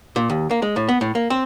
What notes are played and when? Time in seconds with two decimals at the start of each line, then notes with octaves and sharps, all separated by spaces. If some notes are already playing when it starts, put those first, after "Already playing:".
0.16 A#2
0.30 D#2
0.51 A#3
0.62 G#3
0.76 A2
0.88 B3
1.01 A2
1.15 A#3
1.30 C4